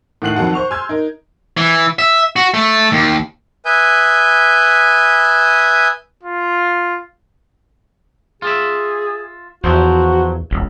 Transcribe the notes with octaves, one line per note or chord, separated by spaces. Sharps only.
A2 D#3 F#5 F#6 C7 F#7
F2 D#3 F#3 F#5 A5
C5 C#6 F7
G#5 C6 E6 F6 G6 G#6
D#4 A#4
E3
E5
F#4
A3
D#2
B4 E5 G#5 D#6 G6
F4
F4 G#4 E5
E2 F3 F#3 F#4 C5
E1 C#2